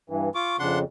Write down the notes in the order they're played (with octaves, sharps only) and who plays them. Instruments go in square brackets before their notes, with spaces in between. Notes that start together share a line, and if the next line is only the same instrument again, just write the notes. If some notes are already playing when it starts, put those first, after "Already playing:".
[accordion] G2 E3
[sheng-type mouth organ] F4 D6 [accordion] C#6
[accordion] F2 C#3 [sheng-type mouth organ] D4 F#5 C6